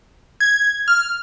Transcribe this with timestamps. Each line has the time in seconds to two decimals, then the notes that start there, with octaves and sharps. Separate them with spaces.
0.40 G#6
0.88 F6